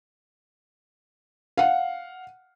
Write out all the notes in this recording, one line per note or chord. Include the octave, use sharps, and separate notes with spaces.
F5 F#5